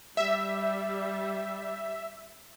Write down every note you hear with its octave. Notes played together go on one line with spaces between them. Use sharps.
G3 E5